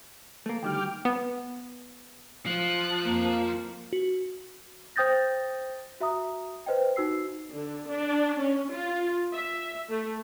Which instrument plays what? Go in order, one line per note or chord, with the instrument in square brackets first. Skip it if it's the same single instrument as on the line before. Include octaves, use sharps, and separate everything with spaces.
[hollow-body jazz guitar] A3 A#3
[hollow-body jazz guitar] D2 D#3 G3 [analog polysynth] G5 D6 F6
[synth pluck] B3
[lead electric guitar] F3 [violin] F#6
[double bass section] F2 A#3
[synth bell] F#4
[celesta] C5 G5 D#6 G6 A6 A#6
F#4 E5 A#5 D#6
B4 C5 D#5 G5
D#4 F#4 E6 C7
[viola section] D3
D4
C#4
F4
E5
A3